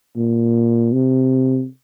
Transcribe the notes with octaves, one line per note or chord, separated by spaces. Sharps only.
A#2
C3